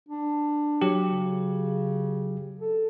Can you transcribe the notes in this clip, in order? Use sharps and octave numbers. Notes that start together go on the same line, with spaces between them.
D4
F#3 G4
C#3
A4